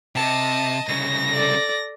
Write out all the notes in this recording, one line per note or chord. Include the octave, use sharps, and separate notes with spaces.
C3 D#5 A5
C2 C#3 A#6
A4 D5